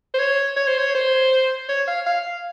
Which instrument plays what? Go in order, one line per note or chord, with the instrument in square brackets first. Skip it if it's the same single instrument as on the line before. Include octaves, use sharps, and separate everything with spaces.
[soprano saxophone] C5
C#5
C#5
C5
C#5
C5
C#5
F5
F5